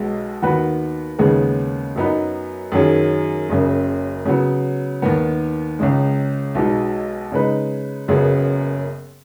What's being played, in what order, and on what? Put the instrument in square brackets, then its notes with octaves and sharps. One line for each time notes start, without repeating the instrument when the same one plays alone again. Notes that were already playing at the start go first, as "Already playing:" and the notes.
Already playing: [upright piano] B1 B2 G#3
D#2 D#3 B3 F#4 B4
D#2 C#3 G#3 B3 G#4
F#2 F#3 B3 D#4 B4
F#2 D#3 F#3 C#4 G#4
F#1 F#2 C#3
C#3 F#3 B3
D#2 D#3 B3
C#2 C#3 G#3
B1 B2 G#3 D#4
C#3 G#3 D#4 B4
F#1 F#2 C#3 B3 G#4